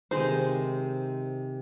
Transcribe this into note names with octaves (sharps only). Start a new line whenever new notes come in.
C3 D#3 G#3 D#4 C5